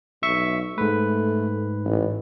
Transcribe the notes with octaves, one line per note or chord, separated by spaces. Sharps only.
B1 E5 C#6
G#2 A3 B4
A1